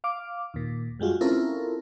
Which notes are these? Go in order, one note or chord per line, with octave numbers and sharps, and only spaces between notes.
F5 D6
D#2 A#2
F#2 G3 G#3 F4 F#4
C4 C#4 E4 F4 A4 A#4